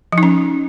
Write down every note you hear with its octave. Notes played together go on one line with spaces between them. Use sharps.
F3
D#4
C#4